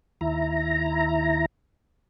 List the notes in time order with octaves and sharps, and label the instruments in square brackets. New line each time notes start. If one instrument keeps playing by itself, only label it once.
[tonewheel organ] D#2 E4 A#5